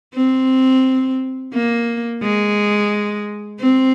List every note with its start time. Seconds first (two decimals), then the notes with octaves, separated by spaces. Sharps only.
0.15 C4
1.54 A#3
2.23 G#3
3.60 C4